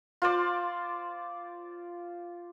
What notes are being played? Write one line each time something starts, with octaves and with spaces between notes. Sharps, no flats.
F4 C5 D5